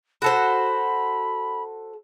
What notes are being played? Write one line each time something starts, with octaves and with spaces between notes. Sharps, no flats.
F#4 A4 C5 B5